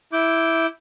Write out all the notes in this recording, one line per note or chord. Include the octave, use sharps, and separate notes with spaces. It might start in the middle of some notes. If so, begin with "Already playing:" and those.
E4 D6 G6